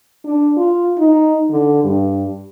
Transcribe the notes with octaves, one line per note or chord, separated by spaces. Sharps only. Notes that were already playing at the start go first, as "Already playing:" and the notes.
D4
F4
D#4
D3
G2